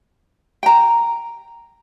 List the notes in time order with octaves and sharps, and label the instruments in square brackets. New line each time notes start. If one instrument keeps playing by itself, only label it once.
[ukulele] G5 A#5